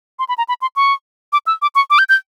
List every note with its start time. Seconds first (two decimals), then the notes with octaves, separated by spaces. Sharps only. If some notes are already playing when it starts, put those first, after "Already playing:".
0.19 C6
0.29 B5
0.38 A#5
0.49 B5
0.62 C6
0.76 C#6
1.33 D6
1.47 E6
1.62 D6
1.75 C#6
1.90 D6
1.99 G6
2.09 G6